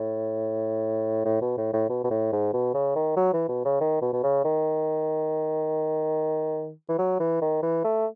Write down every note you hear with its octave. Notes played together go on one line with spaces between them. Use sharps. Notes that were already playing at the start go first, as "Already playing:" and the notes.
Already playing: A2
A2
B2
A2
A2
B2
B2
A2
G#2
B2
C#3
D#3
F#3
E3
B2
C#3
D#3
B2
B2
C#3
D#3
E3
F#3
E3
D#3
E3
A3